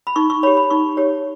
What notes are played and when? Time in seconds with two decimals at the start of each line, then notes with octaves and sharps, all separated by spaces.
0.07 B5
0.16 D#4 C#6
0.30 C#6
0.43 C#5 B5
0.47 G4
0.57 B5
0.70 D#4 C#6
0.97 G4 C#5